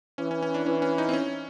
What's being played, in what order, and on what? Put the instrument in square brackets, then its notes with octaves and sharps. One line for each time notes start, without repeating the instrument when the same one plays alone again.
[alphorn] E3 [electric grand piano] C#4
[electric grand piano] C#4
C#4
D4
[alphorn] E3 [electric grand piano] C#4
[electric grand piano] C#4
D#4
C4
C#4